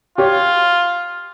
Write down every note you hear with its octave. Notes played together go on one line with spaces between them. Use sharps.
F4 G4 C#5